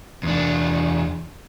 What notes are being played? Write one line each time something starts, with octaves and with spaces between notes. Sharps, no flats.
E2 D4